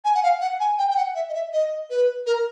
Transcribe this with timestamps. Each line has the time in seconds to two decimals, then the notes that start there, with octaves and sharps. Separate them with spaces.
0.04 G#5
0.14 F#5
0.23 F5
0.41 F#5
0.60 G#5
0.78 G5
0.91 G5
0.96 F#5
1.15 E5
1.29 D#5
1.34 E5
1.52 D#5
1.90 B4
2.26 A#4